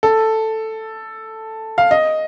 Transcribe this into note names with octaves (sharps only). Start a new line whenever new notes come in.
A4
F5
D#5